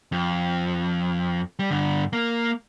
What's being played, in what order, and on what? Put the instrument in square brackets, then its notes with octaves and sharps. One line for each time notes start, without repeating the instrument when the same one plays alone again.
[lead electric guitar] F2
G3
G2 D3
A#3